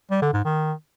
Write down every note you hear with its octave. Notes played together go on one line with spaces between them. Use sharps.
G3
D3
G#2
D#3